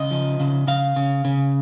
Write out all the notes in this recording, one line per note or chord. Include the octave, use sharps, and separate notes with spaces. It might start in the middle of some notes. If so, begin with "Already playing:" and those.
Already playing: C#3 D#5
F3
C#3
C#3 F5
C#3
C#3